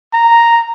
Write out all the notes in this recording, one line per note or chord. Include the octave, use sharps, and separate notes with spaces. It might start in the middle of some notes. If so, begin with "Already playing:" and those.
A#5